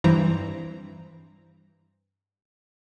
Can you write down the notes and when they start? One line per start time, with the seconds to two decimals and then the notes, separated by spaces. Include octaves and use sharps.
0.04 G2 E3 C4 A#5